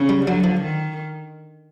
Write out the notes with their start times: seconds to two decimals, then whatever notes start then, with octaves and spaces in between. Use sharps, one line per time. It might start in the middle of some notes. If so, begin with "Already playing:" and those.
Already playing: C#3
0.09 G3
0.27 D3 F#3
0.44 F3
0.62 D#3